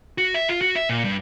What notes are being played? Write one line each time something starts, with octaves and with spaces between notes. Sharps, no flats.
F#4
E5
F4
F#4
E5
A#2
G2